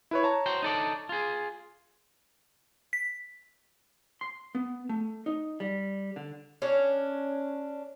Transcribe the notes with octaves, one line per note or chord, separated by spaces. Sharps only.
E4 B4 C#5
C#5 A5 A#5
F#4 C5 G5
D#4 A4 D5
F4 G#4
B6
C6
B3
A3
D#4
G3
D3
C#4 D4 C#5